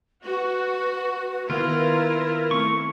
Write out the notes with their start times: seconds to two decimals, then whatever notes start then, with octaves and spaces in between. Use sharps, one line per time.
0.25 F#4 B4
1.50 D#3 B3 E4 F4 A#4 F5
2.51 A3 C4 C#6